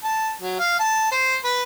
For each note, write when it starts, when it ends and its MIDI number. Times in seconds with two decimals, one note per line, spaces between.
0.04 0.32 81
0.41 0.58 54
0.60 0.77 77
0.80 1.08 81
1.12 1.35 72
1.44 1.63 71